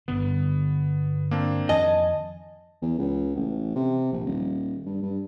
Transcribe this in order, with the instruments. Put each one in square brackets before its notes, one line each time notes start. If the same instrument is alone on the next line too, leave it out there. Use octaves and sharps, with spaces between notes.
[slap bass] G1 G2 D3 [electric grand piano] B3
[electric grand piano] A#3 C4 D4
[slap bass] F2 D#3 F3 [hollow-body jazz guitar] D#5 [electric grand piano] G#5 A5
[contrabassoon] E2
C#2
A1
C3
A#1
D#1
G2
G2